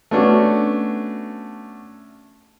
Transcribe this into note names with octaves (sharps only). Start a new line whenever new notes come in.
A3 B3 C#4 D4 F#4